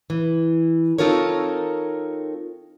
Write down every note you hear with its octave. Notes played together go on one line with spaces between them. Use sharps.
E3
C4 D#4 F4 A4 A#4 C#5